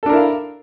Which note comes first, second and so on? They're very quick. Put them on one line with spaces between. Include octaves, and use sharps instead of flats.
A4 D4 A#4 E4 F5